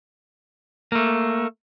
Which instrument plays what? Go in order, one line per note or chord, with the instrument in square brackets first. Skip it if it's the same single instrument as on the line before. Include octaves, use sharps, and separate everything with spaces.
[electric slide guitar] A3 A#3